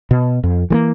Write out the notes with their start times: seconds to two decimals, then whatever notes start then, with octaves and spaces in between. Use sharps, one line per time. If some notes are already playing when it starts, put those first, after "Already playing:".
0.11 B2
0.44 F2
0.70 E3 G#3 A#3